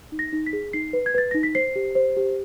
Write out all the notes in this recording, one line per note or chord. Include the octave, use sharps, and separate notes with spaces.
D#4
A#6
D#4
B6
G#4
D#4 C7
B4
G#6
B4 A6
D#4 A#6
B6
C5 C7
G4
C5
G4